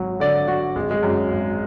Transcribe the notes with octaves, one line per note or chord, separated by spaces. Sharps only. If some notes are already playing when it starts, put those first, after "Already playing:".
Already playing: G#1 F#3
D3 D5
F#3 F#4
G#1 G#3
G#3
F#2
G#1